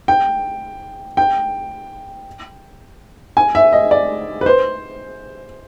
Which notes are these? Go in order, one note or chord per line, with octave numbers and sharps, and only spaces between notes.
G5
G5
G#5
E5
D#5
D5
B4
C5